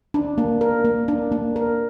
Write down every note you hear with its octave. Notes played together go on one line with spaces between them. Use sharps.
D4
A#3
A#4
A#3
D4
A#3
A#4